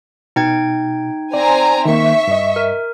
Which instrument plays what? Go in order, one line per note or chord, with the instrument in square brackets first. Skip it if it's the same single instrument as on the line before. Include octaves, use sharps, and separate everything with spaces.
[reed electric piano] B2 [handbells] D#4 G5 G#6
[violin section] C4 G#5 A#5 [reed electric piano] D5
[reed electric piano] D#3 A#3 [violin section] E5 C#6
[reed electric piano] G2 D#5
[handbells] A#4